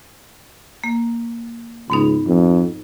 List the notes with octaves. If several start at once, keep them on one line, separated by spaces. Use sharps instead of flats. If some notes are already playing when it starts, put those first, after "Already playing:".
A#3
C#2 G#2 B3 D#4
F2